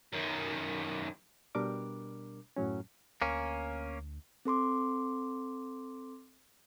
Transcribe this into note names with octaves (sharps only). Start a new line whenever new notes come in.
F#2 D#3
B2 G3 D4 A#4 D6
F#2 A2 F#3 C#4
D2 A#3 C#4
C4 A4 C6 D6